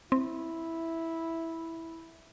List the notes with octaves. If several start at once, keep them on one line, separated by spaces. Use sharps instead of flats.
C4 E4